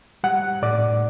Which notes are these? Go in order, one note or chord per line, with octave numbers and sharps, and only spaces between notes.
G3 F#5
A2 D5